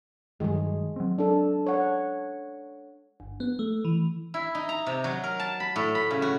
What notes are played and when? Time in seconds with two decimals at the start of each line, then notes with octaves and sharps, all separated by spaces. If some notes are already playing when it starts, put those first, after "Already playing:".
0.40 G2 D#3 F#3 G#3 G#4
0.96 F#3 C4
1.18 D4 A4
1.66 C#5 F#5
3.20 G1
3.40 B3
3.59 A3
3.85 E3
4.34 E4
4.55 D#4
4.69 A#5
4.86 C3
5.04 F#3
5.24 A#4
5.40 A5
5.60 B5
5.76 A2
5.95 B5
6.11 C#3
6.22 F#4